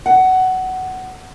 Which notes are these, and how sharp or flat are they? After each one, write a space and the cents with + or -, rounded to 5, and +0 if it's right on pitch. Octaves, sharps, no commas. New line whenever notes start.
F#5 +15